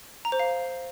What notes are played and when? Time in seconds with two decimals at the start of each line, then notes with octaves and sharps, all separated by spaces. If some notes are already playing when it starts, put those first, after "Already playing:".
0.25 A#5
0.32 C5
0.40 F5